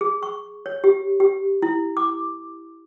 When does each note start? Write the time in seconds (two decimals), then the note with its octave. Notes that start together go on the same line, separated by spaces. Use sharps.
0.01 G#4
0.23 C#6
0.66 C#5
0.84 G4
1.20 G4
1.62 E4
1.97 D6